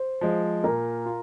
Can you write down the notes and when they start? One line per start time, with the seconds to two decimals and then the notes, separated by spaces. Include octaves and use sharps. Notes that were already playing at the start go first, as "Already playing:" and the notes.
Already playing: C5
0.21 F3 G#3
0.64 A#2 A#4
1.06 F4